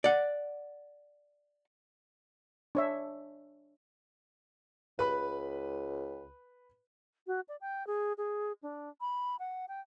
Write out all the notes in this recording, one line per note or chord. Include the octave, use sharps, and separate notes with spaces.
D5 F#5
D4 C#5 E5
C#2 B4 B5
F#4
D5
G5
G#4
G#4
D4
B5
F#5
G5